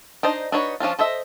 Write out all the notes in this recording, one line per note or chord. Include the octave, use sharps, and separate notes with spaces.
D4 D#4 C5 D#5
D4 D#4 F#4 B4 C#5
F3 C#4 D4 F4
A4 C5 D#5 E5